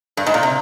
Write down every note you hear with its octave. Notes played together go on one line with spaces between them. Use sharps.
G2
G#2
A#2
C3